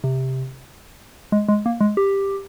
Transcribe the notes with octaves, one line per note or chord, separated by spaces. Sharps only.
C3
G#3
G#3
A#3
G#3
G4